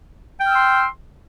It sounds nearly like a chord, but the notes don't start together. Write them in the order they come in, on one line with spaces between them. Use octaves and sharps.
G5 F6 E6 C6